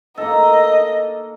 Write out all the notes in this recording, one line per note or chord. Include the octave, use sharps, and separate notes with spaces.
A#3 D#4 A4 D#5